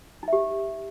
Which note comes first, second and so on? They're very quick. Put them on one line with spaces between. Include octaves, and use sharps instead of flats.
D#4 E5 G4